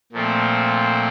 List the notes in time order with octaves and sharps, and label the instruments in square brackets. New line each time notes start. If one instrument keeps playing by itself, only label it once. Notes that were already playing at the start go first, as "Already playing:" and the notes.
[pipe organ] A#2 F3 A3 C4